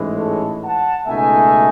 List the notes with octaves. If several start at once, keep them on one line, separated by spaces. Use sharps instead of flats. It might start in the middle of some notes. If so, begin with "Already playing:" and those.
Already playing: A1 G#2 E3 G#3
A4 C#5
F#5 A5
C#2 B2 A3 D#4 E5 G#5